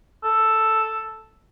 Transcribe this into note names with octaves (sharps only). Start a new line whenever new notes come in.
A4